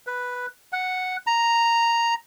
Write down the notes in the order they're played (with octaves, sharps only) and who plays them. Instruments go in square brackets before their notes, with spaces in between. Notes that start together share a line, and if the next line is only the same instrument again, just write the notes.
[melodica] B4
F#5
A#5